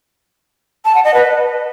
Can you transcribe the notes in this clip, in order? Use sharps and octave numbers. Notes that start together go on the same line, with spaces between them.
A5
F#5
D#5
B4